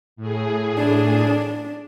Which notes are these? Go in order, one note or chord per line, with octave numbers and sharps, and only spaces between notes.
A2 G#4
D4